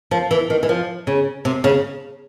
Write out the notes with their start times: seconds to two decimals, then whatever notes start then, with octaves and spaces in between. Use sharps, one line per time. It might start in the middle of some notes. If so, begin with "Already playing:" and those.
0.11 F3
0.31 E3
0.50 D#3
0.63 E3
0.69 F3
1.07 C#3
1.45 C3
1.64 C#3